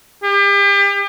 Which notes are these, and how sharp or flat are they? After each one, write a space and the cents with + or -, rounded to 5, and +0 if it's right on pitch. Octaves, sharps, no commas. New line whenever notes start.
G4 +35